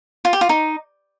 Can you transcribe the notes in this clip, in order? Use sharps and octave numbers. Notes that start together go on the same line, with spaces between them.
F4
G4
F4
D#4